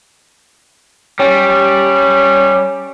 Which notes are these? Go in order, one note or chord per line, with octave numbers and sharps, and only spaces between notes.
G3 C#4